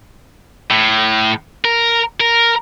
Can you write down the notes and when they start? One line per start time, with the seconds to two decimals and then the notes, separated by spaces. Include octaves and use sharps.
0.71 A2
1.65 A#4
2.20 A#4